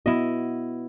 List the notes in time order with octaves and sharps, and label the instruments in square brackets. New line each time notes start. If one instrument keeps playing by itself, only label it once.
[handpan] B3 F#4 [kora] E4 D#5